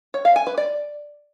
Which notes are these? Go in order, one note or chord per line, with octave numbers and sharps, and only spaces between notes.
C#5
F5
G#5
B4
D5